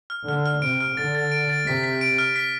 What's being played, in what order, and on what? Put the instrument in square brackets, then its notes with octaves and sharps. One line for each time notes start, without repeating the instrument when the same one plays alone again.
[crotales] F6
[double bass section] D3 [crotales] F6
[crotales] F6
[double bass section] C3 [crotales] D7
[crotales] F6
[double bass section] D3 [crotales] A6
[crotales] A6
D7
A6
[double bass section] C3 [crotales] B6
[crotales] B6
D7
F6
B6